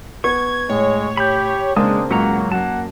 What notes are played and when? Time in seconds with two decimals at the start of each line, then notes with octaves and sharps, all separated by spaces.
0.24 B3 C#6 G#6
0.70 A2 G#3 C#5
1.17 G4 B5 G6
1.76 C#3 G#3 A#3 C4 D4 G5 A5 D#6
2.10 C#2 G#2 F#3 A#3 C#4 F#5 A#5
2.52 F#2 A#3 F#5 A5